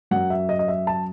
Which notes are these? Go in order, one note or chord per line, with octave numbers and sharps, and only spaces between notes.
F#2 F#3 F#5
E5
D#5
D#5
E5
A5